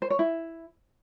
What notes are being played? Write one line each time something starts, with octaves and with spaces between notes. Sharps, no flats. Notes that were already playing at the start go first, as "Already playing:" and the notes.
C5
C#5
E4